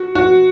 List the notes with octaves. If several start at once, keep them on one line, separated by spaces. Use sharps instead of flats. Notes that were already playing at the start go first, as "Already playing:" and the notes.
Already playing: F#4
F#4